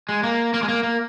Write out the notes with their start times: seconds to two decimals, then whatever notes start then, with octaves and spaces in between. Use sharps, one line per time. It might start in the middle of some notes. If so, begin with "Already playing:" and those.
0.09 G#3
0.23 A#3
0.54 A#3
0.63 G#3
0.68 A#3
0.83 A#3